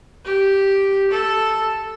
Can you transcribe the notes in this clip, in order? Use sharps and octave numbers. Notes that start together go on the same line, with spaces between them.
G4
A4